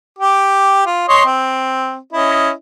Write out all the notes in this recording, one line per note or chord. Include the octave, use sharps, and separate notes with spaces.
G4 D6
F4
C#5 D#5 C6
C4
C#4 E4 D#5